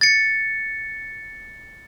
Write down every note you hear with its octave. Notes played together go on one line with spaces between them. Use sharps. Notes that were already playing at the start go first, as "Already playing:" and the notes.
A6 C#7